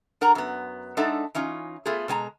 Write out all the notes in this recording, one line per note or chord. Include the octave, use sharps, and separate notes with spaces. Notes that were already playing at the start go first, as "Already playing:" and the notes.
D4 A#4 F#5 A#5
F#2 B3
G#3 D4 D#4 A4 E5 F#5
E3 C#4 D#4 F4
A3 B3 F4 G#4
B2 G#3 G#5 A#5